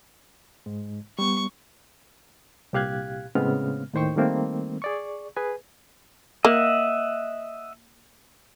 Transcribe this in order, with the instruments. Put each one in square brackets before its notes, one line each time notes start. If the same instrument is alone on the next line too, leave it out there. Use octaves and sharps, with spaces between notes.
[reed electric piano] G#2 G#3
[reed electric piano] G3 B3 [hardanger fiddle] C#6
[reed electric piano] C2 A#2 G4 F5 F#6 G#6
A2 C#3 G#3 B3 C4 F6
D#2 A2 D#3 C5 G5 C#6
D#3 G3 A3 A#3 C4
G#4 D5 C#6
G#4 B4 G#5
[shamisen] A#3 [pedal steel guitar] D#5 E5 F#5